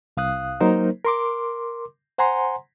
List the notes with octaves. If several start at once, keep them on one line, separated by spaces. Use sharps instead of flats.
C2 F5 D#6 F#6
F#3 A#3 D#4 A#4 C5
A#4 C6 D6
C5 F#5 G#5 A#5 C6